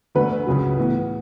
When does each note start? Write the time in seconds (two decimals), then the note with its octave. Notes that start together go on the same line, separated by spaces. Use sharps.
0.15 D2 D3 A3 B4
0.47 C#2 C#3 F#3
0.78 A2 E3 B3